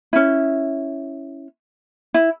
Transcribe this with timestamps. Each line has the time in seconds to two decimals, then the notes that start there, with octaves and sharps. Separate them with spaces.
0.13 C#4 E4
2.14 E4